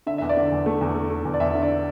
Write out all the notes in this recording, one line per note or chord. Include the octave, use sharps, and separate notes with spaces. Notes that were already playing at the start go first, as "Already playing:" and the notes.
D3 E5
E2 E5
D5
D3
E2
A3
E2
A3
A3
E2
D5
E2 E5
D3
D5